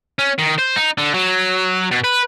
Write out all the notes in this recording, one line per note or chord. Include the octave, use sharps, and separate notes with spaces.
C#4
D#3
C5
D#4
D3
F#3
B2
B4